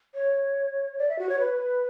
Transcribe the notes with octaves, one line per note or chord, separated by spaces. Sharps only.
C#5
D5
E5
F#4
C#5
B4